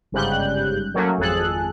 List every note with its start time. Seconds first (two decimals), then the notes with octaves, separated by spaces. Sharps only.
0.12 G1 G#2 C#3 G3 F#6 G6
0.94 F#3 A3 A#3 C#4 F#4
1.18 G#1 F2 G#4 A4 F#6